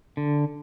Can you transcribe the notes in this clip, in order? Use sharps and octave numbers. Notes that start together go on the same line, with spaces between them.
D3